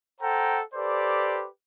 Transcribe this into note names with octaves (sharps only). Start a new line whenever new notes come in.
A4 C5 F#5 G5 A#5
G4 A4 B4 C5 D5